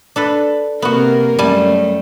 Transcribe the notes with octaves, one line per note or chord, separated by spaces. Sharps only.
D4 A4 B4
C3 A#3 B3 F#4 A#4
F#2 G3 A3 G#5 A5